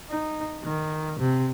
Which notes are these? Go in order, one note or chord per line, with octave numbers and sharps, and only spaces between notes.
D#4
D#3
C3